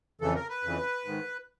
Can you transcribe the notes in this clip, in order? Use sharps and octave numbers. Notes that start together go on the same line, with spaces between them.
F2 C#3 E3 A4
A#4
B4
F2 C#3 E3
G#2 D#3